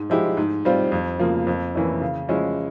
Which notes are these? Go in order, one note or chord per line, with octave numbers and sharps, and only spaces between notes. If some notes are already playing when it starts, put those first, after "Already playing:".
Already playing: G#2
F3 G#3 E4 G4
G#2
G3 C4 F4
F2
C#3 F3 A#3
F2
E3 A#3 C#4 E4
C#3
F3 G#3 C#4 E4